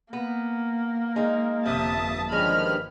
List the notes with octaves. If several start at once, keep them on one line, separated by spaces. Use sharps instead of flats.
A#3 B3
G#3 D#4
G1 F2 C3 E5 A5 D#6
G2 D#3 F3 G#3 C#4 B5 F6